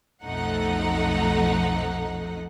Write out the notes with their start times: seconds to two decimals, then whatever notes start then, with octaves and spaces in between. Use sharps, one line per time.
0.23 B1 F2 F3 A3 D#4 F#5